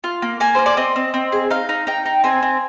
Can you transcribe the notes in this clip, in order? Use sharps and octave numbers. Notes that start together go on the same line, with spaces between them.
F4
A#3
A#3 G#5
A#3 C5
D5
C4 D#5
C4
C4
G#4
D#4 F5
D#4
D#4 G5
D#4
C4 G#5
C4